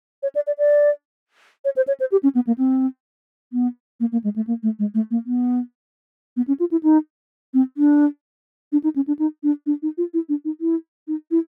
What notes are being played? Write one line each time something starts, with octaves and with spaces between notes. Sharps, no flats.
C#5
D5
D5
D5
C#5
C5
C#5
C5
G4
C#4
B3
A#3
C4
B3
A#3
A#3
G#3
A3
A#3
A3
G#3
A3
A#3
B3
B3
C#4
F4
E4
D#4
C4
D4
D4
D#4
C#4
D4
D#4
D4
D4
D#4
F4
E4
D4
D#4
E4
D#4
E4